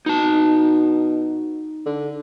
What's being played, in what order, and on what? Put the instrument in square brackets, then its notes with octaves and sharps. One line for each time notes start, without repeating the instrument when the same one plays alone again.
[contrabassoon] B2 [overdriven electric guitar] D#4 A5
[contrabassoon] D3